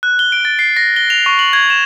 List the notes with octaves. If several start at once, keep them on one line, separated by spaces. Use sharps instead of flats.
F#6
G7
D7
A6
C7
A#6
G7
F7
C#6
F#7
G#6
E7